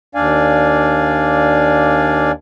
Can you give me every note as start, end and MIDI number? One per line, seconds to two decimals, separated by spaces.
0.15 2.31 39
0.15 2.31 62
0.15 2.31 74
0.15 2.31 77
0.15 2.31 80